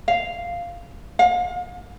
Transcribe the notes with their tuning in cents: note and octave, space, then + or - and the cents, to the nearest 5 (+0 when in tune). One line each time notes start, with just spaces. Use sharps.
F5 -5
F5 +35